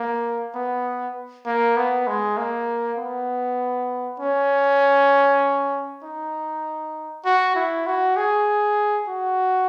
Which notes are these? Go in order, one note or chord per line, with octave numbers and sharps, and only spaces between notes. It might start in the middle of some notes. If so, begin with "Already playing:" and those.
Already playing: A#3
B3
A#3
B3
G#3
A#3
B3
C#4
D#4
F#4
E4
F#4
G#4
F#4